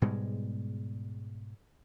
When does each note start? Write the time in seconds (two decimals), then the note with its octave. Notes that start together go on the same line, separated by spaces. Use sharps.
0.02 G#2 B2 G3 G#3